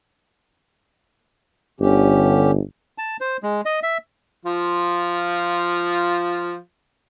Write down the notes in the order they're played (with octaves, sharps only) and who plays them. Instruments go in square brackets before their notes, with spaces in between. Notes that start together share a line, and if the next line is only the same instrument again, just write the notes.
[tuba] G1 [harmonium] D3 C#4 G4
[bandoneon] A5
C5
G#3
D#5
E5
[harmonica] F3 F4